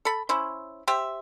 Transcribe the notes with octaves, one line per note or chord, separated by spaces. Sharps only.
A4 B5
C#4 E4 C5
G4 C5 E5